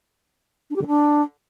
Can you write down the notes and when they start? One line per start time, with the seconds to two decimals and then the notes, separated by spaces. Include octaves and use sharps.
0.70 D4
0.76 G4
0.81 D3
0.87 D4